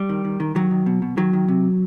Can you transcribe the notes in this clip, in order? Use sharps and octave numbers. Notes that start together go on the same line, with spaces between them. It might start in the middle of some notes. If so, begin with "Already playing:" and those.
Already playing: G3
D#3
D#3
D#3
D#3 F#3
D#3
B2
B2
D#3 F#3
D#3
C3